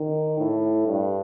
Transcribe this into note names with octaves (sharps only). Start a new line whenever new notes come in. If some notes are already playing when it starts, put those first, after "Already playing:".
Already playing: D#3
A2
G2